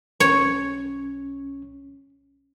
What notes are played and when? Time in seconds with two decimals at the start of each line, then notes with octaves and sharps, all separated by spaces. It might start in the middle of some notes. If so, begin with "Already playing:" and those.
0.20 B1 C#4 C#5